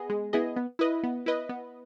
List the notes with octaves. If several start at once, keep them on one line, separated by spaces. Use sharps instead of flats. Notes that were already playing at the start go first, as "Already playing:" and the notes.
Already playing: B3 G#4 D#5
G#3
B3 E4 G#4 D#5
B3
E4 B4 D#5
B3
E4 B4 D#5
B3